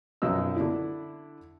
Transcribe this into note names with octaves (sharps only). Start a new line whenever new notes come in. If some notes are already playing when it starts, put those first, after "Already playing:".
B1 F#2 F3 D#4 D#5 E6
D3 D4 E4